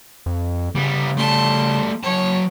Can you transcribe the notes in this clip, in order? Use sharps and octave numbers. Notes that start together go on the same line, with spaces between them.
F2
C#3 G3 B3
G3 A3 A5 C6
F#3 C#5 A5